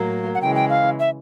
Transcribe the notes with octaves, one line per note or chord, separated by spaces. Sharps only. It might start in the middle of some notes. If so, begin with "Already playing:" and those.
Already playing: A2 F#3 A#3
F#5
C#3 E3 G#3 G5
G5
F5
E5